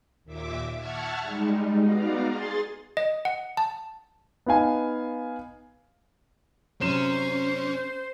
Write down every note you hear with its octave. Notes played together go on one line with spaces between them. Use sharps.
D#2 A#2 E5 D6
E5 F#5 A5 C#6 F6 G#6
G3 G#3 D#4
B3 D#4 F#4 D5 F5 A#5
G#4 C6 A6
D#5
F#5
A5
B3 D#4 F5 G#5
F#2 C3 C#4 C5 E7